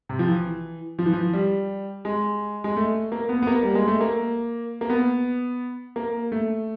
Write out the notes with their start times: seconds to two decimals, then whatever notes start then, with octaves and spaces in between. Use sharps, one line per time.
0.09 C3
0.19 F3
0.27 E3
0.99 F3
1.06 E3
1.13 F3
1.33 G3
2.05 G#3
2.64 G#3
2.77 A3
3.12 A#3
3.29 B3
3.42 B3
3.47 A#3
3.63 G3
3.75 G#3
3.88 A3
4.01 A#3
4.81 A#3
4.90 B3
5.96 A#3
6.32 A3